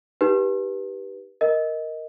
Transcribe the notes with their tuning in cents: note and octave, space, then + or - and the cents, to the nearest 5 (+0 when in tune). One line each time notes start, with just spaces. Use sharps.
D#4 +35 G4 +0 B4 -20
A#4 +0 D#5 +15